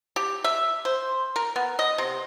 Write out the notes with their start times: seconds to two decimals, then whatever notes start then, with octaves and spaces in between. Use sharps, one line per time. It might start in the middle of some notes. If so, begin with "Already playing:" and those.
0.16 G4
0.44 E5
0.85 C5
1.36 A#4
1.56 B3
1.79 D#5
1.98 C3